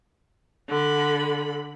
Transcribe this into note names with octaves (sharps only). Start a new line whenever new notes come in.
D3 B5